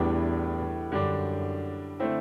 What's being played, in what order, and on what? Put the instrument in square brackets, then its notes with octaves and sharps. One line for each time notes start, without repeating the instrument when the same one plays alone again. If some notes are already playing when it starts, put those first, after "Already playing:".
Already playing: [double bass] E2 [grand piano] A2 G3 B3 D4
[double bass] F#2 [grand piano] D3 G3 D4
[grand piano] D3 A3 C4 E4